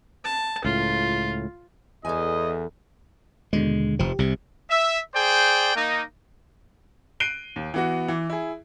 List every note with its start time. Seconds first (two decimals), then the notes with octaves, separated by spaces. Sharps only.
0.25 A5
0.65 C#2 A2 F4
2.05 E2 A4 D#5 G#5
3.53 D#2 B2 D3 G#3
3.99 F1 F3 G4
4.19 C2 C3
4.70 E5
5.14 G#4 C5 D5 G5
5.75 A#3 D#4
7.20 F#6 C7 D7 D#7 G7
7.56 D#2
7.74 E3 B3 F#4
8.08 E3
8.29 E4 G#4